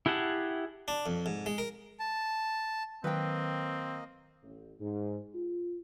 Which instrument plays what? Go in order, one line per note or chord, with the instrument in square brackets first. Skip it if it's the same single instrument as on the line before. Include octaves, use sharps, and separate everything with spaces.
[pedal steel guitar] E4 G4 G#4 F#5 A5
[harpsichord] D4
F2
G#2
G#3
A#4
[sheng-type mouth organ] A5
[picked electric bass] D#3 F#3 [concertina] A#3 D#5 [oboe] C4 [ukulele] B4 G5
[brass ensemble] A1
G#2
F4